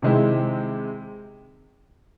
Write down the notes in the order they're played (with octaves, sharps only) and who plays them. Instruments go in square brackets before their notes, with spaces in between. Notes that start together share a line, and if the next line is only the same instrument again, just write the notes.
[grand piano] C3 D#3 G#3 C4 E4